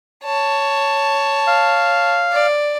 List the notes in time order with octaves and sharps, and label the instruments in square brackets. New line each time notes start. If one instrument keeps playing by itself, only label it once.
[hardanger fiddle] C#5 A5
[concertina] F5
[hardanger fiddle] D5